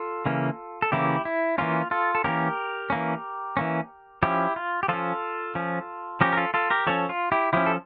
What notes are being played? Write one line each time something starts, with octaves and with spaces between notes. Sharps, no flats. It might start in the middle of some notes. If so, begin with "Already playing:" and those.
Already playing: F4 A4
C#3 E3 A#3 C#4
A4
C#3 E3 A#3 C#4 E4 G4
E4
E3 A#3 C#4 F4
F4 A4
A4
E3 A#3 C#4 G4 A#4
E3 A#3 C#4
E3 A#3 C#4
F3 C#4 E4 G4
F4
G4
F3 C#4 F4 A4
F3 C#4
F3 C#4 G4 A#4
A#4
F4 A4
F4 A4
G4 A#4
F3 C#4 A4 C#5
F4
E4 G4
F3 C#4 E4 G4
A4